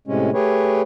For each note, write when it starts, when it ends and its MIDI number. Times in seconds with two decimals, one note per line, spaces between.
0.07 0.30 45
0.07 0.30 48
0.07 0.30 56
0.07 0.30 61
0.34 0.82 57
0.34 0.82 67
0.34 0.82 68
0.34 0.82 71
0.34 0.82 73